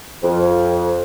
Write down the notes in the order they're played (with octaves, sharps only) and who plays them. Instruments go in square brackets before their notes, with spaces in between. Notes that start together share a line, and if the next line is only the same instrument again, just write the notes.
[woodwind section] F2